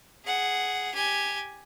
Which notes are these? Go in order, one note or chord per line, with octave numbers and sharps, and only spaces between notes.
G#4 F#5
G4 G#5